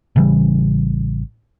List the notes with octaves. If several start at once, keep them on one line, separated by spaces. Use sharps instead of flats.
A1 C#3 E3 G3